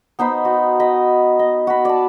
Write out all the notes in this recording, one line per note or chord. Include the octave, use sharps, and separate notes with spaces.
B3 D#4 C5 B5
F#4
D#5 B5
D#5
F#4 B5
D5 A5